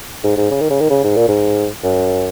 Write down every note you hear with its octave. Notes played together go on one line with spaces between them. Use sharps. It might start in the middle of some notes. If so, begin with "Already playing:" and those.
G#2
G#2
C#3
D#3
C#3
D#3
C#3
G#2
A#2
G#2
F#2